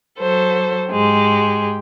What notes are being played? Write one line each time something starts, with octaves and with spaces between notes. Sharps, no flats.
F#3 A4 C5
G#2 G#3 G4